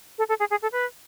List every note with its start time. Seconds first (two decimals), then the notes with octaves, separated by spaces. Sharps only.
0.18 A4
0.29 A4
0.40 G#4
0.51 G#4
0.62 A4
0.72 B4